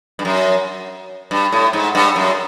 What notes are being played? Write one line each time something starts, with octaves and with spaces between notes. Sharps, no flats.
G2
F#2
G2
A2
G#2
G2
F#2